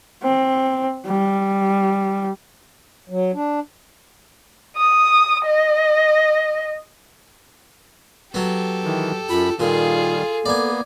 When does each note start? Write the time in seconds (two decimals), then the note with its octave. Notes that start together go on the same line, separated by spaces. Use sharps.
0.23 C4
1.07 G3
3.10 F#3
3.34 D4
4.77 D#6
5.45 D#5
8.34 F#3 B3 G4 A4
8.84 D#3 E3
9.30 F#2 F4 B5
9.60 A#2 D#3 G3 F4 G#4 A4
10.46 A#3 B3 D5 G#5